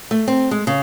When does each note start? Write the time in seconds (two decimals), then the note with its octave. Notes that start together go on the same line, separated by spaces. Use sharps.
0.11 A3
0.28 C4
0.51 G#3
0.67 C#3